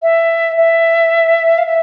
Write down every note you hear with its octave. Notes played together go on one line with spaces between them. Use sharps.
E5
E5
F5
E5